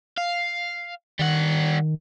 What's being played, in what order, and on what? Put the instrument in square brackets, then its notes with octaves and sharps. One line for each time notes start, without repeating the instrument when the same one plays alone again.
[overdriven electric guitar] F5
[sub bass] D#3 [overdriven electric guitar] G3 F#5